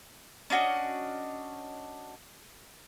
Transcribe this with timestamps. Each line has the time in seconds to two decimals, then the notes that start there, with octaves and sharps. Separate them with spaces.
0.50 C#4 D4 F#4 D#5